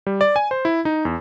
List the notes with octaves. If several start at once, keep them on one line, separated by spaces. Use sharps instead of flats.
G3
D5
G#5
C5
E4
D#4
E2